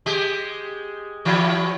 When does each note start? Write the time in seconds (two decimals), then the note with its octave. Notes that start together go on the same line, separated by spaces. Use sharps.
0.06 G#3 G4
1.25 E3 F#3 E4